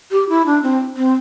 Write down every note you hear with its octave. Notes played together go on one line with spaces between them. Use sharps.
G4
E4
D4
C4
C4